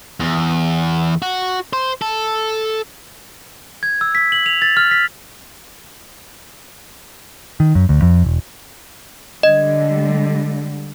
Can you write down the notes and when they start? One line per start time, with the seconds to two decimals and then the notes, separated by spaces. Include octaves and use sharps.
0.20 E2
1.22 F#4
1.73 C5
2.02 A4
3.83 G#6
4.01 E6
4.15 B6
4.32 F#7
4.46 F7
4.62 A6
4.77 F6
4.91 B6
7.60 D#3
7.75 F#2
7.89 D2
8.02 F2
8.24 E1
9.43 D3 G3 G#3 D#5